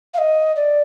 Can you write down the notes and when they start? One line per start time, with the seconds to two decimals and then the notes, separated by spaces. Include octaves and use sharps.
0.14 F5
0.18 D#5
0.56 D5